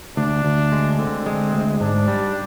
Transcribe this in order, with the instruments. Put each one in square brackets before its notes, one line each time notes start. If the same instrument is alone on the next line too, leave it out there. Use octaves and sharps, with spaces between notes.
[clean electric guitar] D2 [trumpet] D4
[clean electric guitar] D2
G#3
[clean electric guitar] D3 [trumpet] C4
[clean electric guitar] G#3
D2
[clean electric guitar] G#2 [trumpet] D4
[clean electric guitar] G3